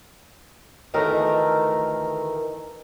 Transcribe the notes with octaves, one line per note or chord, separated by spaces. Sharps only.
D2 D#3 E3 A3 A#4